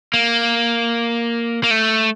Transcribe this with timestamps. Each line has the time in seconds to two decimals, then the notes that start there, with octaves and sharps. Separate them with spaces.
0.14 A#3
1.64 A#3
1.71 A3